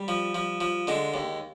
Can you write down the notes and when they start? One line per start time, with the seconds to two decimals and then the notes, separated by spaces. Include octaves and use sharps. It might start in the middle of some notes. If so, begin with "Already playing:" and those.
Already playing: G3
0.08 F3
0.35 F3
0.61 F3
0.87 D3 G#3
1.14 D#2